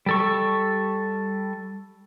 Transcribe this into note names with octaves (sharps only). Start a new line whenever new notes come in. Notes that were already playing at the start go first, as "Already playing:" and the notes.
G3 A4 C#6